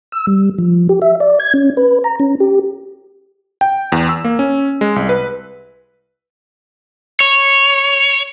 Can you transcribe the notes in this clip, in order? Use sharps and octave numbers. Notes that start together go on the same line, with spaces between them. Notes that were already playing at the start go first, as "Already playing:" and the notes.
E6
G3
F3
G4
E5
D5
G#6
C#4
B4
A#5
C#4
G4
G5
E2
E6
A#3
C#4
G#3
C2
B4
C#5